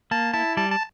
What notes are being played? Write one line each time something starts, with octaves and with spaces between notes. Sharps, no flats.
A#3 A5
E4 A5
G3 A5
A5